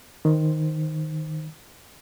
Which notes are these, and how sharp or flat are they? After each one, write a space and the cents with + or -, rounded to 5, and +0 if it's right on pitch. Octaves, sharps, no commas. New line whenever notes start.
D#3 +0 C5 +0